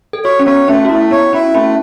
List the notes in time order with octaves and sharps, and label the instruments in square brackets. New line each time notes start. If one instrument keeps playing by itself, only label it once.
[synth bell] A4
[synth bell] F#4 [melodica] C#5
[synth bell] C#4
[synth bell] B3 [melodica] C#5
[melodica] A3 [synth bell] C#4
[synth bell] F#4
[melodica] A3 [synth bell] E4
[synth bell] B3 [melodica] C#5
[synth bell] C#4 [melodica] E4
[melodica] A3 [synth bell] C#4